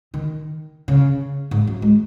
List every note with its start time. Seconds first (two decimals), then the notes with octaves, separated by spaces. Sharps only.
0.14 D#3
0.88 C#3
1.51 G#2
1.67 F#2
1.82 G#3